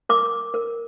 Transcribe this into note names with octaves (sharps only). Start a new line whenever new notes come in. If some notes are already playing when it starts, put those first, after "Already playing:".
A#4 D6
A#4